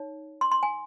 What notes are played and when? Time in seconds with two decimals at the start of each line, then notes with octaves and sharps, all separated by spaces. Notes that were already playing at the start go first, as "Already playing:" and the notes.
Already playing: D#4 C#5
0.41 C6
0.51 C6
0.63 G#5